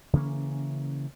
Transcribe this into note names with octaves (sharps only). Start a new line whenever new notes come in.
C#3 E3 A#3 C#4